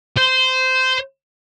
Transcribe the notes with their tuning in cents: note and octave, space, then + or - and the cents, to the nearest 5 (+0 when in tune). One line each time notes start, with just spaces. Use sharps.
C5 -15